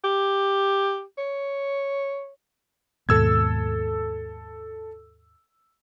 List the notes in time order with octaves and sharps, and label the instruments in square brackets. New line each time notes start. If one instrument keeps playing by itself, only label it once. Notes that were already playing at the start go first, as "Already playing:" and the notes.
[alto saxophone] G4
C#5
[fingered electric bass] D#2 G#2 B2 [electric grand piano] A4 E6 G#6